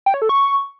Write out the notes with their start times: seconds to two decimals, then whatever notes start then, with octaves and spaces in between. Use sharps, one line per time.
0.06 G5
0.14 C#5
0.22 A4
0.29 C#6